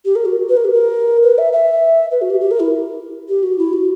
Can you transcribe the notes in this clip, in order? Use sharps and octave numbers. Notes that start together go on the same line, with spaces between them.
G4
A#4
F#4
B4
A#4
G4
A#4
B4
E5
E5
B4
F#4
G4
G4
A#4
E4
G4
F#4
E4
F#4